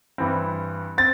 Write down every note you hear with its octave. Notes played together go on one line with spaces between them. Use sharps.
G2 E3 C4
C4 A6